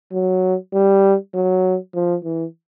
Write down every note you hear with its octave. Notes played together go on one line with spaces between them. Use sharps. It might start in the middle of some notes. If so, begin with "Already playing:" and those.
F#3
G3
F#3
F3
E3